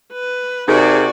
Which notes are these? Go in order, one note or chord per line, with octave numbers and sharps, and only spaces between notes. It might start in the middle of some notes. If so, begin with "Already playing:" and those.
B4
C3 D#4 F#4 G#4 A#4 D5